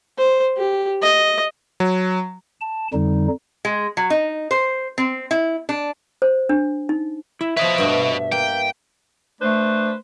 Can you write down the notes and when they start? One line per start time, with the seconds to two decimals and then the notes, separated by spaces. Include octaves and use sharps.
0.18 C5
0.57 G4
1.02 D#5
1.80 F#3
2.61 A5
2.93 F2 D3 G3 D#4
3.65 G#3
3.97 F#3
4.10 D#4
4.51 C5
4.98 C4
5.31 E4
5.69 D4
6.22 C5
6.49 D4
6.89 D#4
7.41 E4 E5
7.57 F3 B4 C#5 D#5 E5
7.78 G2 B2 A3
8.32 A#3 G5
9.41 A3 D4 B4 C5